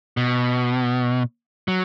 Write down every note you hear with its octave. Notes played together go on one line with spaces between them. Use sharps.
B2
F#3